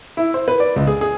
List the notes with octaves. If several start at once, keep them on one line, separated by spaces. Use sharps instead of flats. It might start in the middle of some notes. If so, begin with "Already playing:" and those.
E4
C5
B4
D5
C#2
G#4
G#4